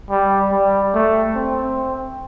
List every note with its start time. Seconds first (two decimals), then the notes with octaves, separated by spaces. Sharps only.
0.10 G3
0.52 G3
0.94 A3
1.35 C4